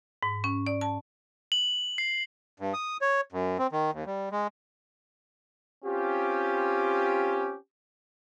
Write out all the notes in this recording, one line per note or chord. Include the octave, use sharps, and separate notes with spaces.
G#2
C#4
D5
A5
F#7
C7
G2
D#6
C#5
F#2
C4
D#3
D#2
G3
G#3
C4 C#4 F4 G4